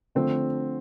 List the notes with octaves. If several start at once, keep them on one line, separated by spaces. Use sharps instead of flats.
D3 F3 A3 C4